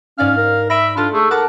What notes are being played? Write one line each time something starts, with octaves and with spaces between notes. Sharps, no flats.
G#2 C#4 D5 F5 F6
A#4
E5 B5 A#6 D7
D4 F4 A4 F6
A3 G#4
A#4 F#5 A5 B5 D6